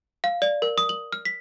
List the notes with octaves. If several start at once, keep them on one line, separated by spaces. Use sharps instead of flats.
F5
D5
A#4
D#6
F#7
F6
B6